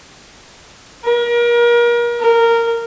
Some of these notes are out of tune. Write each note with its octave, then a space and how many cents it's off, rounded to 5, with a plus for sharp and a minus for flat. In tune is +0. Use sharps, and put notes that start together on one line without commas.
A#4 +35
A#4 -10